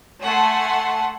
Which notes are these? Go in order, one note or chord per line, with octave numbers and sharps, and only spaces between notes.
A3 F#5 G#5 A5 C6